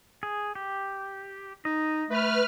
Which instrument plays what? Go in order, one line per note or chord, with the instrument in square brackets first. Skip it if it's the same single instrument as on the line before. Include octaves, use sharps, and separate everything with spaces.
[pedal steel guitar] G#4
G4
[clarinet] D#4 [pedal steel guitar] D#5
[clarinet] A3 [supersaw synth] B4 F6